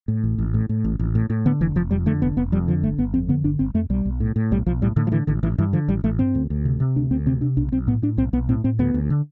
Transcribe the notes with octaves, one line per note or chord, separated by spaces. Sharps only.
A2
A1
A1
A2
A2
A1
A1
A2
A2
D3 B3
F1 E3
F1 F3
F2 G3
D3 A3
F1 B3
F1 B3
F2 G3
D3 F3
G1 A3
G1 B3
F2 C4
D3 B3
G1 D4
G1 C4
F2 A3
B1 G3
B1
A2
A2
B1 G3
B1 F3
A2 G3
A2 D3
F3
D3 E3
A1 D3
A1 E3
G2 E3
D3 F3
A1 G3
A1 A3
G2 C4
D2
D2
C3
C3
D2 D4
D2 C4
C3 C4
C3 D4
B1 D4
B1 C4
A2 B3
A2 D4
B1 C4
B1 B3
A2 C4
A2 C4
D2 B3
D2
D3